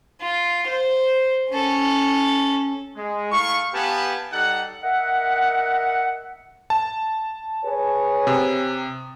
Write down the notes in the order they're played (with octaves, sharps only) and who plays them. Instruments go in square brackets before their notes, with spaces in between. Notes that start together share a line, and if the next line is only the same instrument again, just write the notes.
[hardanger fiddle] F4
C5
C#4 A4
[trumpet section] G#3
A3 E4 F5 C#6
B3 G4 B4 F5 G#5 A5
G3 D#4 A4 F#5
[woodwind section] A#4 D#5 E5 F#5
[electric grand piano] A5
[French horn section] G#4 B4 C#5
[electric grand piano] C3 D#6